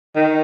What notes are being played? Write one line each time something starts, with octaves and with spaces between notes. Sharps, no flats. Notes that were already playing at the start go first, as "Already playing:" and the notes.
D#3